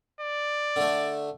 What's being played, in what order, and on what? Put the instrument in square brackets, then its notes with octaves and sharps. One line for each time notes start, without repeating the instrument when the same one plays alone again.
[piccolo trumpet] D5
[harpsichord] D3 A3